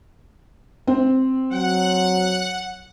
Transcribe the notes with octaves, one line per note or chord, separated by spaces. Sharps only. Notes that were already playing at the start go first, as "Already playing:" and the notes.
C4
F#3 F#5